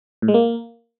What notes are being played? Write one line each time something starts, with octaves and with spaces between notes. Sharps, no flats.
A2
G#3
A#3